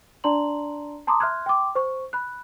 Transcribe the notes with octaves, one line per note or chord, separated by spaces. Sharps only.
D4 D5 A5 A#5 C6 F#7
A5 A#5 C6 D6 D#6
E5 C6 F6 F#6 G#6
G5 C6 D6
C5 C#6
B5 F#6